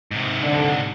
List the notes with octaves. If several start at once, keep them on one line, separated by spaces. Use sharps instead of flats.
G#2 C3
D3